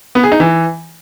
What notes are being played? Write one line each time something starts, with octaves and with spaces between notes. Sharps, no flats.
B3
G#4
D#4
E3